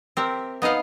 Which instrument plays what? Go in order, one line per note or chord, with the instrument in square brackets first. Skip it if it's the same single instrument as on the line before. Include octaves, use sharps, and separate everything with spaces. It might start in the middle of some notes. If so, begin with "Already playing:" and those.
[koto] C4 G4 A#4 E5
B3 D#4 D#5 F5 F#5